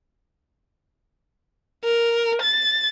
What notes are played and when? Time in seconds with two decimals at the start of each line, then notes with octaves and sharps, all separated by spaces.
1.84 A#4
2.42 A6